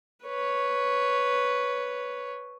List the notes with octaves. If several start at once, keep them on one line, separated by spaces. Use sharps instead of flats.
B4 C#5